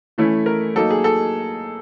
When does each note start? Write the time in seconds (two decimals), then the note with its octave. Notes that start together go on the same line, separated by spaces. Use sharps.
0.18 E3 A3 C#4 E4
0.46 A#4
0.75 F#3 A#3 D#4 A4
0.91 G#4
1.04 A4